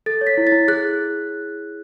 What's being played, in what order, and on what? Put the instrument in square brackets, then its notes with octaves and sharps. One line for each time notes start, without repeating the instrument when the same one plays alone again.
[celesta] A4 A6
C#5
B6
E4
A6
E4
G#4 F#6